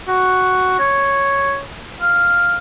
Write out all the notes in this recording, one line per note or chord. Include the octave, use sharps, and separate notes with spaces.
F#4
C#5
F5